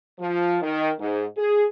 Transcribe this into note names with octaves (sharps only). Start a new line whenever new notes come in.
F3
D#3
G#2
G#4